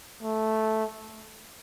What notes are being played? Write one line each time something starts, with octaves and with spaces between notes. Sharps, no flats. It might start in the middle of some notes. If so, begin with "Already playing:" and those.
A3